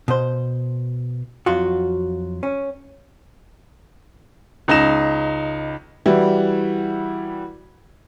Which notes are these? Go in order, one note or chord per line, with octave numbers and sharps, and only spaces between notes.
B2 C5
F2 F#3 F4 F#4
C#4
C#2 D#4 A#6 E7
E3 G3 E4 F#4